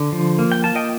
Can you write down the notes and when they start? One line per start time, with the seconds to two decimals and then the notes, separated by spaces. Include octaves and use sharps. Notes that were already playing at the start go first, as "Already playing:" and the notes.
Already playing: D3
0.12 F3
0.39 A#3
0.52 G5
0.64 F4 A5
0.75 D#5 G5